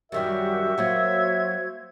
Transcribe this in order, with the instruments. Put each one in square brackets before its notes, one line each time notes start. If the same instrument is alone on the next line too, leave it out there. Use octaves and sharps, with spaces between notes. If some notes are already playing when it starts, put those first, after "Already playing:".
[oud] F#2 D#3 G3 [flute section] F#4 G4 A#4 [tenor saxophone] E5
[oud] F#3 A#3 F4 [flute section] F#4 C5 G#6